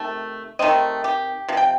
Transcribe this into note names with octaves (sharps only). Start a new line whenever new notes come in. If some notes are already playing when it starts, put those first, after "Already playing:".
Already playing: C3 D#3 A3
C3 D#3 A3 C4 D#5
G4
C3 F3
G5